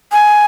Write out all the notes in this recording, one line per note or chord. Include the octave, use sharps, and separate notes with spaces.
G#5